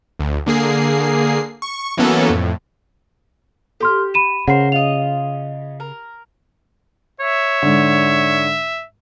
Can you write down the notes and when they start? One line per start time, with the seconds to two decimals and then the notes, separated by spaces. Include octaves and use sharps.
0.20 D2
0.46 D3 A#3 G#4 C7
1.62 C#6
1.97 E3 F#3 A#3 B3 C#4 A4
2.30 F2 A2
3.80 G4 A4 C6 F6
4.14 B5 D#7 E7
4.48 C#3 A#4 C5 F#5 C7
4.72 F4 D#5 F7
5.80 A#4
7.20 C#5 E5
7.63 G#2 D3